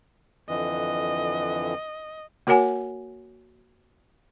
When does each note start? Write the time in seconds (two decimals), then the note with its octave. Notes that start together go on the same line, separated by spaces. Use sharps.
0.49 F2 D3 E3 D#5
2.47 A#3 F#4 A#4 C#5 F#5 G#5